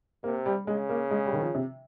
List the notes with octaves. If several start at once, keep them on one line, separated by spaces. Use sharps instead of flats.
C3 A#3
G3
C#3 G#3
A#3
G#3
G3
D#3
F3
C3